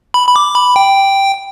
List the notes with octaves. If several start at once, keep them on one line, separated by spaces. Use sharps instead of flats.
B5
B5
D6
B5
G5